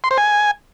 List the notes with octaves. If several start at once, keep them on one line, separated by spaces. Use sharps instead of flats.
C6
C5
G#5